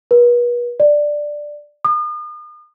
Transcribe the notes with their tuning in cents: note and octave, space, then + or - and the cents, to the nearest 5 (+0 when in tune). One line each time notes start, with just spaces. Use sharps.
B4 -40
D5 +5
D#6 -40